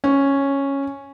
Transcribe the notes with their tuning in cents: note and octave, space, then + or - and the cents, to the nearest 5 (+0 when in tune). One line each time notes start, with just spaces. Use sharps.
C#4 -5